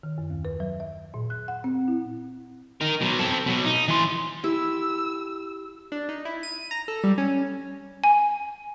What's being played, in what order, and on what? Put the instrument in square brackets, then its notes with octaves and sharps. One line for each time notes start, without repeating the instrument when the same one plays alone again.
[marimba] D#3
F#2
D#2
B4
F#3
E5
A#2
F#6
F#5
C4
E4
[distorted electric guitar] D#4 A#4
B2 F#3
C4 A4
B2 F#3
D#4
E3 C6
[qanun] E4 [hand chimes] G4 [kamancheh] E6
[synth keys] D4
D#4
E4
D#7
A#5
A4
G3
C#4
[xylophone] G#5